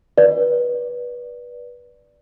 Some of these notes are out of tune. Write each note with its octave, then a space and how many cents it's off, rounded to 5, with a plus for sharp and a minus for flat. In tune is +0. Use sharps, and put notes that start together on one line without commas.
B4 -20 D5 +0